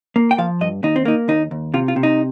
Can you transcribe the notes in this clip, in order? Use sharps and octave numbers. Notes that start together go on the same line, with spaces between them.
A#3
G5
F3 F5
G2 D#5
D#2 D#4
C4
A#3 D#4
D#2 D#4
D#2
C3 F4
F4
C3
D#4